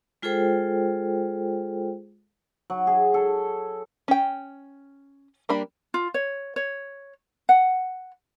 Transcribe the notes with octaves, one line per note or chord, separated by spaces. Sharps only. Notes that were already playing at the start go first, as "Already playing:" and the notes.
G#3 F4 G#4 A4 C5 G5
F#3
G#4
A4
C#4 G5
G3 A#3 D4 B5
F4
C#5
C#5
F#5